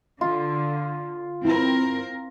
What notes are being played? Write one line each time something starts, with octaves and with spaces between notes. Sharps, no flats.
D3 F4
C4 E4 A#4